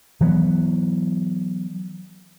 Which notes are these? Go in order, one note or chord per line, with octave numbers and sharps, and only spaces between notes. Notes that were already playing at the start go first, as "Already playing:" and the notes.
E3 F#3 A#3 B3